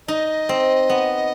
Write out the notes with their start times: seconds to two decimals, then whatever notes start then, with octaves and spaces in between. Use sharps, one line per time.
0.08 D#4 D#5
0.49 C4
0.90 B3